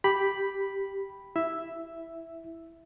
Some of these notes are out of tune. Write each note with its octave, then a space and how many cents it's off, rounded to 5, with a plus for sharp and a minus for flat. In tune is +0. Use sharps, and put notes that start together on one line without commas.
G4 +0 B5 +0
E4 +0 E5 +0